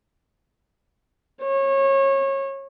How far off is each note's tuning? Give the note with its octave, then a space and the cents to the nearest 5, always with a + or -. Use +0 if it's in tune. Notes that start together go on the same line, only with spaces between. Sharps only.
C#5 -25